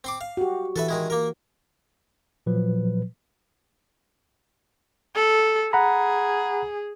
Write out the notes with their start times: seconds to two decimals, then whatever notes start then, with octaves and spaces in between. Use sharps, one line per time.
0.04 C4 C6 D6
0.21 F5
0.37 F#4 G4
0.76 E3 A4 B4 E5
0.89 D#3 G#3 E4
1.10 A#3 A#4
2.46 A#2 F3 F#3 B4
5.16 A4
5.73 G#4 F#5 A#5 B5